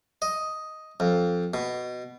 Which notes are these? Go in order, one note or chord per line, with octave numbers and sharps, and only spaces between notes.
D#5
F2
B2